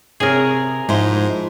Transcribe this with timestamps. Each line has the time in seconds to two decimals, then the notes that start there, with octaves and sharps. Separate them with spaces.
0.20 C3 G#4 A#4 C#5
0.89 G#2 F3 E4 C5